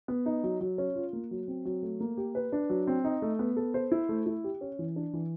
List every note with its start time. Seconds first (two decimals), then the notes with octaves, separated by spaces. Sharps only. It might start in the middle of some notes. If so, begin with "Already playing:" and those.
0.08 B3
0.26 D#4
0.43 F#3
0.61 F#3
0.78 C#4
0.95 F4
1.13 A#3
1.31 F#3
1.48 C4
1.65 F#3
1.83 A3
2.00 A#3
2.17 G4
2.35 B4
2.52 D4
2.70 F#3
2.87 C4
3.04 D#4
3.22 A3
3.39 B3
3.56 A4
3.74 C5
3.92 E4
4.09 A3
4.26 E4
4.44 G4
4.61 C#4
4.79 E3
4.96 D4
5.13 E3